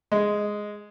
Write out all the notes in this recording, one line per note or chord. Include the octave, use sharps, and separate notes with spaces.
G#3